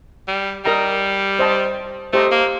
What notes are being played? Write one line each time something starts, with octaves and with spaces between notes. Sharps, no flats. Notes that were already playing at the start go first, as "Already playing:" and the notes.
G3
G3 A#4 D#5 A#5
C5 D#5 A5
A3 G4 C5 D#5 A#5
A#3